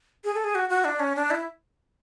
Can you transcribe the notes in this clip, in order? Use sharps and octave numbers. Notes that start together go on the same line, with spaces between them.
G#4
A4
G#4
F#4
F#4
D4
C#4
D4
E4